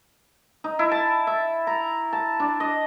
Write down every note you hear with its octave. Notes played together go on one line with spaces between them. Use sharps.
D#4
E4
A5
E5
A#5
A5
D4
D#5